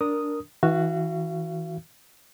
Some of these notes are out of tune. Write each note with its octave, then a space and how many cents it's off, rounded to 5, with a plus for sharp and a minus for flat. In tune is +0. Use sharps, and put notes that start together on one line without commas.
D4 -5 A#4 +0 D#6 +0
E3 -25 F#4 +0 F5 -40